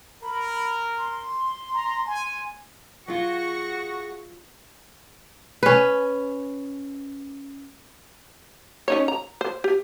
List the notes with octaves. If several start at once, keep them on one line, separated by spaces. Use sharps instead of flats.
A#4 B5
C6
A#5
G#5
F#3 F4 F#4 G#4 C#6 A#6 C#7
C#4 B4
C#4 D#4 C#5
A#5
C5
G4